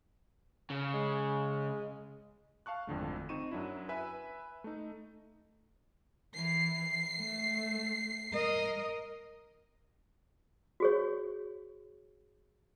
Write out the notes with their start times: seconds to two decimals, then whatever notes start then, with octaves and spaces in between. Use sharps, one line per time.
0.70 C#3
0.94 G#3
2.66 F5 A5 C#6 F#6
2.87 G#1 F2 D3 A3
3.29 C4 D#4 C#6 D#7 E7
3.51 F#2 F#3 D4 E4
3.89 B4 E5 G#5
4.64 A3 D#4
6.35 E3 C7
7.19 A3
8.33 A#4 D#5
10.80 F#4 G#4 C#5